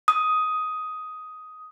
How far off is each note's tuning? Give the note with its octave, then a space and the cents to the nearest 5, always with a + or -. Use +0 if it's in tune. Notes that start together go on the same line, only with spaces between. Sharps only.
D#6 +10